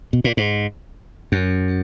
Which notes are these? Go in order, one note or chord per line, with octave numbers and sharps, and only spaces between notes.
B2
A#2
G#2
F#2